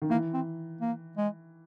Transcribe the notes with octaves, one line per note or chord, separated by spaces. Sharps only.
D#3
E3 A#3
C4
A#3
G#3